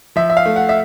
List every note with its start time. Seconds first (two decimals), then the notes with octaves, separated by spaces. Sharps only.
0.16 F3 E5
0.30 E5
0.37 F5
0.46 A3
0.56 F#5
0.69 E5